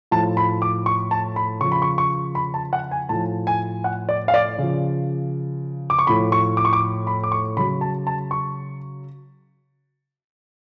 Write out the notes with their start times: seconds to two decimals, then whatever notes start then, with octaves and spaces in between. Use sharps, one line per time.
0.11 A2 F3 A5
0.37 B5
0.62 D6
0.86 C#6
1.11 A5
1.36 B5
1.61 C#3 F3 C#6
1.72 B5
1.82 C#6
1.98 C#6
2.35 B5
2.54 A5
2.73 F#5
2.91 G#5
3.09 A2 F3 A5
3.47 G#5
3.84 F#5
4.09 D5
4.28 F5
4.34 D5
4.58 C#3 F3
5.90 D6
5.99 C#6
6.07 A2 F3 B5
6.32 C#6
6.57 D6
6.65 C#6
6.73 D6
7.07 B5
7.24 D6
7.32 C#6
7.57 C#3 F#3 B5
7.81 A5
8.07 A5
8.31 C#6